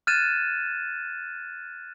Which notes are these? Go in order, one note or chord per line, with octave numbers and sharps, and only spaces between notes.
F6 F#6 G#6 A6 D#7 E7